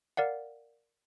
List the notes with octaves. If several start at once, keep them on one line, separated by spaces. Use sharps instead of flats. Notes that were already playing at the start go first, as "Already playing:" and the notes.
A#4 D5 F5 F#5